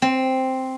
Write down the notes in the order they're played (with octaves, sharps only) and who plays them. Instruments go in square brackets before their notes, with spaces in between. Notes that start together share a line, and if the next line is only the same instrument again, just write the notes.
[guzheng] C4